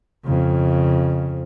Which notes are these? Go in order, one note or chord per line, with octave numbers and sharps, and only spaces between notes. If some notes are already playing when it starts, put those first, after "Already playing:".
F2 C#3